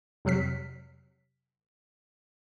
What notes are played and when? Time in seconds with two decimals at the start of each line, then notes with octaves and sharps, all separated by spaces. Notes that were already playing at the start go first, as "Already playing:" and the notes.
0.25 F2 C3 F#3 F6 B6